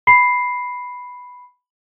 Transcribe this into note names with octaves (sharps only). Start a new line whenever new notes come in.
B5 C7